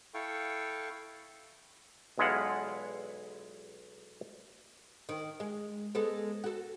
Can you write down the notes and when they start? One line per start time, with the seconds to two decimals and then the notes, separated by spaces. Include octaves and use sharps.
0.14 E4 A4 F5 G5 C#6
2.18 B1 E2 G#3 E4 F4 F#5
5.09 D#3
5.40 G#3
5.95 G#3 B3 A4
6.44 F#4 A4